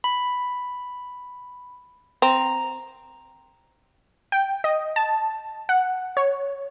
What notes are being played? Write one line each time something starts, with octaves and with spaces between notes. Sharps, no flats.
B5
C4 A#5
G5
D#5
A5
F#5
C#5